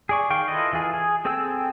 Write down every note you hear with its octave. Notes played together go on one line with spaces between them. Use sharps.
G#4 D5 C#6
D#3 F5 G5 C#6
E4 F4 A4 B4 D#5
E3 F4 G#4
G#4
C4 G#4 A4 G5 E6